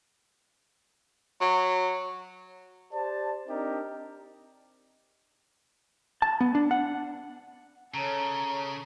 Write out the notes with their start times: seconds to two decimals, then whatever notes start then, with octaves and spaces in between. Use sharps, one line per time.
1.41 F#3
2.92 G4 C5 D5 A5
3.48 C4 D4 D#4 G4 A#4
6.22 A5
6.41 B3
6.55 D4
6.71 F#5
7.94 C#3 A4 C#5 A#5